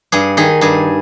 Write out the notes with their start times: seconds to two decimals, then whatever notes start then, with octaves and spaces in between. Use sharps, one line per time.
0.12 G2 G#4
0.37 D#3 G#4
0.61 G2 G#4